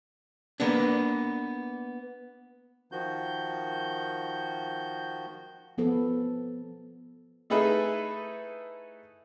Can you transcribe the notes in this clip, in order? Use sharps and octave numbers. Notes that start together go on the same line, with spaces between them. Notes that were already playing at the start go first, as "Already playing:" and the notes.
A#3 B3 D4
D#3 F3 F#4 G6
F3 B3 A4
A3 D#4 E4 G#4 A4 B4